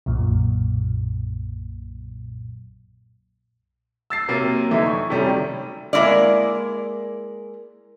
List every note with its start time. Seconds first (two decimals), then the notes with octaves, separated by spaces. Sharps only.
0.06 B1 F#2 A#2
4.10 E6 A6 C7
4.28 C3 F#3 A#3
4.71 D3 E3 A3 D#4 E4
4.86 C#6
5.10 C3 D#3 F#3 G3 A3 C#4
5.93 G#3 A#3 C4 E4 D5